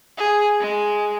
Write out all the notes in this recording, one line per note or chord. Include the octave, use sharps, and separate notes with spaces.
G#4
G#3